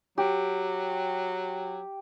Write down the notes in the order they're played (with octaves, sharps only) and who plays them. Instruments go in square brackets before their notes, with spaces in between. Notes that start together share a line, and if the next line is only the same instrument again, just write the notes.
[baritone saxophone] F#3 [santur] G4